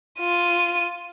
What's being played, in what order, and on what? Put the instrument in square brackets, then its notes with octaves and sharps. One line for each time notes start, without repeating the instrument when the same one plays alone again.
[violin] F4 D#7